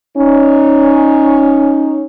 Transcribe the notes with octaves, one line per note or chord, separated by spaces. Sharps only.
C#4 D#4